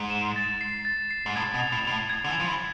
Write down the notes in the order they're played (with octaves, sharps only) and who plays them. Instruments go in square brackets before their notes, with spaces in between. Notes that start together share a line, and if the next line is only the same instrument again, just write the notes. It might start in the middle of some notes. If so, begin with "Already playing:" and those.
Already playing: [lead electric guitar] G#2
[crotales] E7
A6
C7
A6
C7
[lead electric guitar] G#2
[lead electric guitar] A2 [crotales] G#6
[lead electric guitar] B2
[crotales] F7
[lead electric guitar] A2
[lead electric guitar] B2 [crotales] F7
[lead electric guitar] A2
[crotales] G#6
[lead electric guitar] D3
E3
[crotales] F7
[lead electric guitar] F3
E3